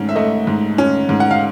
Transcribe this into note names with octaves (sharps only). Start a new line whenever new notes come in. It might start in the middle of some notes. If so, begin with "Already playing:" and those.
Already playing: G#2 A3 C#4
E5
A3 D#5
G#2
C#4
G#2
F#5
F5